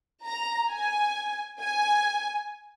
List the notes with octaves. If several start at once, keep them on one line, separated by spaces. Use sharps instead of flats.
A#5
G#5
G#5